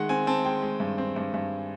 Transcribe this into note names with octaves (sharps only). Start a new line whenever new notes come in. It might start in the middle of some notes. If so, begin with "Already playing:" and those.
Already playing: D#3 G#3 F#5
C4 G#5
C4 A5
G#3 G5
G#3
G2
C4
G2
G2